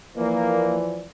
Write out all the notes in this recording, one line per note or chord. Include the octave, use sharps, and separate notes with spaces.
E3 F3 A#3 D5